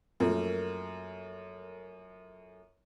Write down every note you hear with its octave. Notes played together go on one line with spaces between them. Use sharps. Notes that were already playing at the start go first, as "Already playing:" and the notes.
F#2 F3 A3 A#3